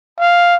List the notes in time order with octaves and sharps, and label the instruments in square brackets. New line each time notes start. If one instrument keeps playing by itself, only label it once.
[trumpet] F5